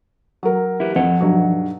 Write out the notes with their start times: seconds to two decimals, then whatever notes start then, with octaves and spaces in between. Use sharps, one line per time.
0.43 F#3 A#4
0.80 E4 G4 B4
0.96 F2 F3 F#5
1.21 B1 G2 F#3